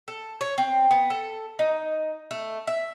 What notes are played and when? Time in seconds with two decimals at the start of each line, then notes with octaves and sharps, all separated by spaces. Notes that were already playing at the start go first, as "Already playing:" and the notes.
0.08 A4
0.41 C#5
0.58 C4
0.91 B3
1.10 A4
1.59 D#4
2.31 A3
2.67 E5